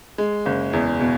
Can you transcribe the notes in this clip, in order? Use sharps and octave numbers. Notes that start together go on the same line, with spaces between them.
G#3
F#1
E2
B2